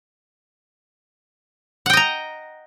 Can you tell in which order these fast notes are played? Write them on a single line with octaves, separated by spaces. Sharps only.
F#5 G5 D#5 A#5